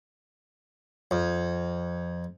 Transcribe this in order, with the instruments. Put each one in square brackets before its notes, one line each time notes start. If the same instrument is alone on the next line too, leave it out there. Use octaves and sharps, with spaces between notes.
[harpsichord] F2